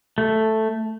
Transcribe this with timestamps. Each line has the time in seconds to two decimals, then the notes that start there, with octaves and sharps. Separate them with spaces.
0.18 A3